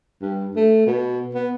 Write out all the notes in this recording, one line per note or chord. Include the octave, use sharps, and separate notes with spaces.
G2
A3
B2
B3